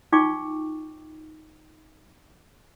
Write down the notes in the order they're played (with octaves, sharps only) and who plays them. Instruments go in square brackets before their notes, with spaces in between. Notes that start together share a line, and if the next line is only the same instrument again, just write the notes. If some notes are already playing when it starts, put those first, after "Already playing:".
[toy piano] D#4 F4 G5 C#6 D6